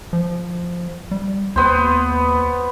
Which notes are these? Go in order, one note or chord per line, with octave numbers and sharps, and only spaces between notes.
F3
G3
D#2 B3 C5